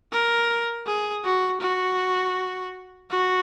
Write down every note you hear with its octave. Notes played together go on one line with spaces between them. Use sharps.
A#4
G#4
F#4
F#4
F#4